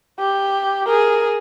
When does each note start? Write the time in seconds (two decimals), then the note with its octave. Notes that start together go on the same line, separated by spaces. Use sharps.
0.19 G4
0.87 G#4 A#4